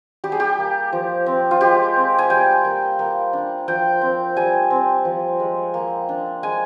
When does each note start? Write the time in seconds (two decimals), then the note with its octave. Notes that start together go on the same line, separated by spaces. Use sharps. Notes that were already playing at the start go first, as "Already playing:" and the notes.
0.24 G3 G4
0.32 G#4
0.40 G4
0.58 A#3
0.92 F3
1.26 C4
1.51 F4
1.61 G#3 G4
1.96 C4
2.18 G#5
2.30 G3 G5
2.65 A#3
2.99 A#3
3.33 D4
3.68 F3 G5
4.01 C4
4.36 G3 G#5
4.70 C4
5.05 F3
5.40 G#3
5.74 A#3
6.09 D4
6.43 G#3 G#5